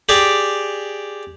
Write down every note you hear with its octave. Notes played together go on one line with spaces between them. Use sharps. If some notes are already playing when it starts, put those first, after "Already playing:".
G4 G#4 D5 G#5